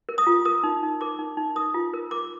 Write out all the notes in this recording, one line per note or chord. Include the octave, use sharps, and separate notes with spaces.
A#4
D#6
F4
A#4 D#6
D#4
D#4
A#4 D6
D#4
D#4
A#4 D#6
F4
A#4
A#4 D6